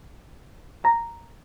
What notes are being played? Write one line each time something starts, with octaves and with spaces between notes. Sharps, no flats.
A#5